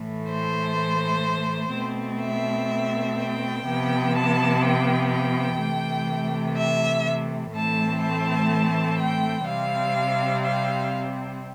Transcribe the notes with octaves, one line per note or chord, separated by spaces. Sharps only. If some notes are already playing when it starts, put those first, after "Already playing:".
Already playing: A2 E3 A3
C5
B2 A3 C4
E5
G5
C3 F3 B3
A5
G5
G5
C3 E3 A3
E5
A2 E3 A3 C4 A5
A5
G5
C3 G3 C4 F5
F5